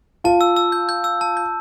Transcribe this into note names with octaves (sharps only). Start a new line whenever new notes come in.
F4 A5
E6
E6
G6
G6
E6
A5
G6